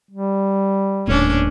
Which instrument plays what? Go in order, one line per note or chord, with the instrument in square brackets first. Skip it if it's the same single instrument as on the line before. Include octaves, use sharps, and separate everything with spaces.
[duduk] G3
[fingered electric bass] D#1 A2 [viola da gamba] C#4 D4